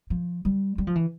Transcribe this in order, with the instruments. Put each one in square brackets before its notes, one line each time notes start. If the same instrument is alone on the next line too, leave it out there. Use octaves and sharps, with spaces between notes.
[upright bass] F3
G3
G3
F3
E3